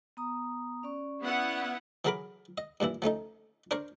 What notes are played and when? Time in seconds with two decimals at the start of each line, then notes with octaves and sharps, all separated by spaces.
0.17 B3 A#5 D#6
0.83 C#4 D5 C#6
1.21 B3 E4 F#5
2.05 E3 F#3 G#4 A#4 B5 D6
2.58 D#5
2.80 G2 A#2 E3 E4
3.02 F3 A3 C#4 D#4
3.71 D4 A#4 C5 C#5